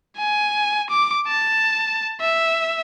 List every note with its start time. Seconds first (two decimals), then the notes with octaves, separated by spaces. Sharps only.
0.17 G#5
0.90 D6
1.28 A5
2.21 E5